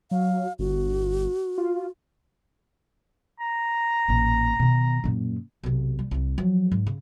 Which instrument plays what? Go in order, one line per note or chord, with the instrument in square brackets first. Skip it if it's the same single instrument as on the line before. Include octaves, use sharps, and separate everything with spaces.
[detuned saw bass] F#3 [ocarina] F5
[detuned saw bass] G1 [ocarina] F#4
[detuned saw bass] F4
[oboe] A#5
[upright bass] A1 A#2
B2 D#3
F#2 A#2
B1 C3
G3
C2 G3
F3 F#3
G#2
C#3